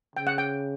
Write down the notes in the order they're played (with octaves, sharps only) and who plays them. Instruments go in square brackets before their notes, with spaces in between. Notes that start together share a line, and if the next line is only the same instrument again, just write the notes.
[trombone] C#3 [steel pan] G5
[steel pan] F#5
G5